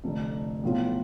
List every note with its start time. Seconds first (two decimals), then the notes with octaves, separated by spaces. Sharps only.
0.04 F1 F2 D3
0.63 B1 A2 F3 B3 F4